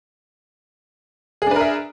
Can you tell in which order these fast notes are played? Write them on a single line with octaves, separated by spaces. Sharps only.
G#4 D4 B4 A#4 E5